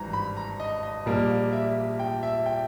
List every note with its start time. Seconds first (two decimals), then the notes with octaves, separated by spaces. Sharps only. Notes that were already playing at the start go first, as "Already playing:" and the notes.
Already playing: G#1 G2 E3 A#5
0.13 B5
0.37 A#5
0.60 D#5
0.83 D#5
1.06 A#1 A#2 G3 A#3
1.53 E5
1.99 G5
2.23 E5
2.46 G5